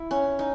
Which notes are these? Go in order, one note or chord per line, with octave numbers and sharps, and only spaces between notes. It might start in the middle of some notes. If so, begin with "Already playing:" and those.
Already playing: E4
C#4
D#4